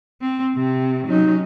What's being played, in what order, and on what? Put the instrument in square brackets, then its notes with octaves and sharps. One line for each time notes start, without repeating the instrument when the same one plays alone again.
[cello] C4
C3
[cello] F#3 C#4 [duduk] D#4